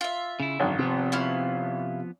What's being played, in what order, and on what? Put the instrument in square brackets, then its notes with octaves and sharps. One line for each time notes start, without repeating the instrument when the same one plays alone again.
[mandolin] F4 E5
[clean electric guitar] C#3 E4
[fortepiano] G#1 [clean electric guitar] F#2 D3 D#3
[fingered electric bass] C3 [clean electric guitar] F3 B3 C4
[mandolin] C#4 E4 F5